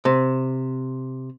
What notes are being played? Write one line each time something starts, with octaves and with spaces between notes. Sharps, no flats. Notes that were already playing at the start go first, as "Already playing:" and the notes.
C3